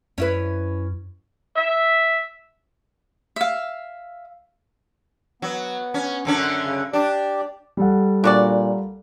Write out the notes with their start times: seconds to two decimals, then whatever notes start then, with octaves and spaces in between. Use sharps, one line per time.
0.18 F#2 C#4 E4 B4
1.56 E5
3.36 E5 F5
5.42 F#3 B3
5.94 C#4
6.25 F#2 D3 C#4
6.63 C#3
6.93 D4 G4 D5
7.77 G3 A4 F#5
8.24 A#2 D4 F#4 D5